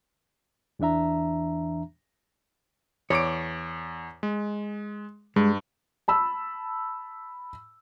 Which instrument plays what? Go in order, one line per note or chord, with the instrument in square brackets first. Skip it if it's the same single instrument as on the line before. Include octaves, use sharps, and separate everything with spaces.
[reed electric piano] E2 E3 D4 E5 A#5
[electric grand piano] E2 D6 D7 [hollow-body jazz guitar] C#5
[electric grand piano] G#3
[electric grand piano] G2 [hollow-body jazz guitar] G#3
[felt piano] A5 B5 E6